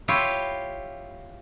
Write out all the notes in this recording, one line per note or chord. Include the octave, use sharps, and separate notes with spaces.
E4 F4 G4 C#5